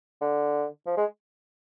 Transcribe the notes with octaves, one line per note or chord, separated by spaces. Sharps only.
D3
F3
G#3